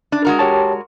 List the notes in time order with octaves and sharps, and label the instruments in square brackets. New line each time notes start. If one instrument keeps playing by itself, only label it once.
[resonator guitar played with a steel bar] D4
G#3 F#4 A#4
[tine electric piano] G4 C#5 A5